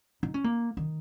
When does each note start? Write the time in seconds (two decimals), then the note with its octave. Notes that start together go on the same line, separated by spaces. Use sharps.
0.23 D#4
0.34 C#4
0.44 A#3
0.77 D#3